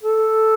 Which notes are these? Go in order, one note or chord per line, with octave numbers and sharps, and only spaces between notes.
A4